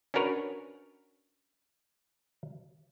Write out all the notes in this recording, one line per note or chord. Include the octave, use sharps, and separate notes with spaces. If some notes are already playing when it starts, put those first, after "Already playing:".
C#4 D4 F#4 A#4 B4 C#5